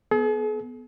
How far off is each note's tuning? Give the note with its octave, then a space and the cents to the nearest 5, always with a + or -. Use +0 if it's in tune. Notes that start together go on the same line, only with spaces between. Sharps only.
B3 +0 G#4 +45